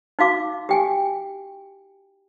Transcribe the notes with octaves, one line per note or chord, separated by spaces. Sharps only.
D#4 F#4 F5 D6
G4 G5 G#5